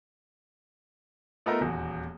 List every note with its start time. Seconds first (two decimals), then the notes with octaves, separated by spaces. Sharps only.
1.46 A3 B3 D#4 F4 A4 A#4
1.61 D#1 E2 F#4